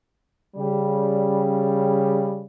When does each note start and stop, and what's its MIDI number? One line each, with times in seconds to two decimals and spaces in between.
0.56 2.46 49
0.56 2.46 55